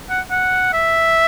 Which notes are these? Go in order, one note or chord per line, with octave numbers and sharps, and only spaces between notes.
F#5
F#5
E5